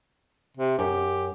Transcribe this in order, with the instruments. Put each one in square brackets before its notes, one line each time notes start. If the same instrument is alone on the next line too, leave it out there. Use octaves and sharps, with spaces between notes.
[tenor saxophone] C3
[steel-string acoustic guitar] F#2 [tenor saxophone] G4